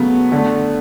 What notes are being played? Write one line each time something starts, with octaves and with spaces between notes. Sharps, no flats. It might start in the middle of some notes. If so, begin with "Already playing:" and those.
Already playing: C#3 F#3 A3 B3
D3 A3